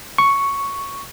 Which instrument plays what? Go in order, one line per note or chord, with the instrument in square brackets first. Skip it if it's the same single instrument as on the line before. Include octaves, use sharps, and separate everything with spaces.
[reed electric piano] C#6